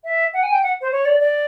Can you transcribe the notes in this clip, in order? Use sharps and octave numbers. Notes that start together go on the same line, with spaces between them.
E5
F#5
G#5
G5
F#5
C5
C#5
D5
D5